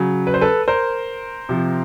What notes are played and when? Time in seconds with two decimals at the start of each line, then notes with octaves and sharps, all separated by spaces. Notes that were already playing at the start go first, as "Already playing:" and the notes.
Already playing: C#3 F#3
0.27 B4
0.34 C5
0.41 A4 B4
0.68 A#4 C5
1.49 C3 F3